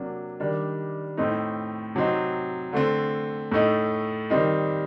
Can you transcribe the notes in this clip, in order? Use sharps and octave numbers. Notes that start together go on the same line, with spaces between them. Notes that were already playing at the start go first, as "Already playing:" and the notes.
Already playing: C3 F#3 A#3 D4
D#3 G3 D4
A2 A3 C4 D#4
C3 F#3 C4 D#4
D3 A3 C4
A2 A3 D#4
D#3 G3 C4 D#4